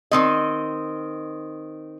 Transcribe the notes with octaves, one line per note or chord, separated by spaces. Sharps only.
D#3 C4 D#5